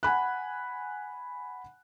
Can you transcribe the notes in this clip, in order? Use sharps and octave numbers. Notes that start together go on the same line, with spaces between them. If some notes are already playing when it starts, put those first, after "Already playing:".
F#5 G#5 B5 F#6